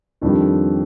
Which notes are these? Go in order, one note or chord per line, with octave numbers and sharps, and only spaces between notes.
F2 D#3 G3 D4